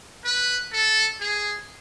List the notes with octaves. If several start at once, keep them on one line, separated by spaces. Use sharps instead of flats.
B4
A4
G#4